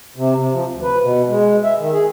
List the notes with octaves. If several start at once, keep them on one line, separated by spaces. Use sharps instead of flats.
C3
C3
F3
D2
B4
B2
G#3
E5
D#3
G#4